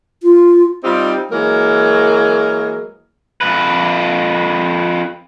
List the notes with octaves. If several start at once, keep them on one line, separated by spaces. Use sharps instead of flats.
F4
G3 C4 D#4 F4 G4
E3 F#3 G#3 A#3 A#4
F2 B4